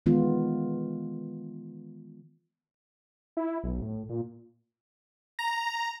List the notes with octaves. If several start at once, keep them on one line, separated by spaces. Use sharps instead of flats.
D#3 E3 G#3 B3 F4
E4
B1
A2
A#2
A#5